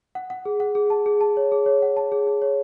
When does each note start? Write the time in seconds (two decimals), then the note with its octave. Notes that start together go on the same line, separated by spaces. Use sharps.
0.15 F#5
0.30 F#5
0.45 G#4
0.60 F#5
0.75 G#4
0.90 A5
1.06 G#4
1.21 A5
1.37 C#5
1.52 G#4
1.66 C#5
1.82 F#5
1.97 A5
2.12 G#4
2.27 G#4
2.42 C#5